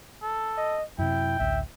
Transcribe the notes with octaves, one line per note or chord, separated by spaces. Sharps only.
A4
D#5
F#2 C3 E4 G5
A1 D2 E5